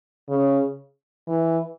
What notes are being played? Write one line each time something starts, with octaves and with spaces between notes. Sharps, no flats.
C#3
E3